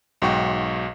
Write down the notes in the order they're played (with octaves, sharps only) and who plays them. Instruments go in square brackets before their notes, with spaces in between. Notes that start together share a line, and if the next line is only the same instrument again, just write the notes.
[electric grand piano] B1 G#2 F#4 G5 C#6